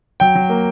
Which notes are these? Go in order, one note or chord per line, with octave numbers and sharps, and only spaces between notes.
F#3 G5
F#3
A#3